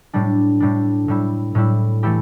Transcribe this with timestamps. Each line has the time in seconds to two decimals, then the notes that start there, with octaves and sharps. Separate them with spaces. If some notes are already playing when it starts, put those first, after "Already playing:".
0.13 A2 G3 D4
0.60 A2 G3 D4
1.08 A2 G3 E4
1.55 A2 G3 E4
2.03 E3 A3 E4 G4